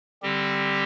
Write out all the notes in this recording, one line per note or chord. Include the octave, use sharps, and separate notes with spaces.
D3 G3 C4 G4